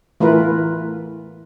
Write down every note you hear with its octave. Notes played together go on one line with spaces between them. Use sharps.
E3 A3 F4 A#4 B4